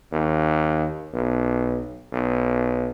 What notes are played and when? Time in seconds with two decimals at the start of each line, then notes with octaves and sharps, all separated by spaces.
0.12 D#2
1.14 B1
2.13 B1